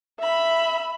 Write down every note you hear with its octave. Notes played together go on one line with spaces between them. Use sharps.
E5 B5